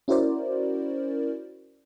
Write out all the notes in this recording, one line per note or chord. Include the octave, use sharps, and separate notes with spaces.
C#4 E4 F#4 A#4 C5 D5